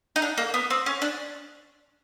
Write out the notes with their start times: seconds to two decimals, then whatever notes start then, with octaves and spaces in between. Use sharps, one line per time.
0.16 D#4
0.22 D4
0.38 A#3
0.54 B3
0.70 C4
0.86 C#4
1.02 D4